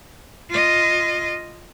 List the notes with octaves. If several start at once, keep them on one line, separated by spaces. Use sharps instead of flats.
F4 D#5